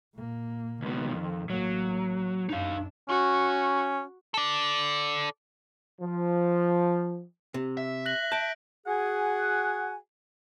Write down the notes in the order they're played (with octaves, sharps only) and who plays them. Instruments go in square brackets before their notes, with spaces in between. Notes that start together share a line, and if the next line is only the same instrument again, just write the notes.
[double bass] A#2 A#3
[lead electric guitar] C#2 B2 [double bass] D#3
[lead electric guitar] F2
[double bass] A1 A#3 [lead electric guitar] F#3
[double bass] F#2 D4 [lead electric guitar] D#4 F5
[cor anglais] C#4 [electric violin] F#4
[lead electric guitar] A4 D5
[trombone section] F3
[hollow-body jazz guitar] C3
[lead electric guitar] E5
[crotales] F#6 A#6 F#7
[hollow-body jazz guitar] A5 [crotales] G6 D7
[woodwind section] F#4 G#4 F#5 G#5